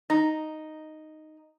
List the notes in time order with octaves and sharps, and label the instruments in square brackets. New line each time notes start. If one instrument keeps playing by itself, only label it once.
[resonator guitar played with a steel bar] D#4